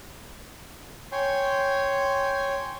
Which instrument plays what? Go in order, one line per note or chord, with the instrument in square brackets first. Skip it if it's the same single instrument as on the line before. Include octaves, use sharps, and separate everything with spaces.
[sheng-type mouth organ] C#5 G5 G#5 C6